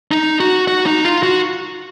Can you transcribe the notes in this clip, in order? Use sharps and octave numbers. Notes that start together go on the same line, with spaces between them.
D#4
F#4
F#4
D#4
F4
F#4